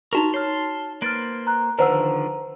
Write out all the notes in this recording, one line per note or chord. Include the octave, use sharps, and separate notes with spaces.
D#4 F#4 A#4 A5 A#5 C#6
C#5 A5 C6 F6
A#3 B4 C5 F6 A6 D7
A#5 F#6
D3 D#3 F3 B4 C5 F#5 A#5 E6